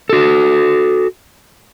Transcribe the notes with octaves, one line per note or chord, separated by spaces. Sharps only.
F#4 A4